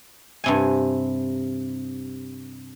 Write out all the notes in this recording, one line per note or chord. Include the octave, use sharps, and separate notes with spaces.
G2 C3 G#5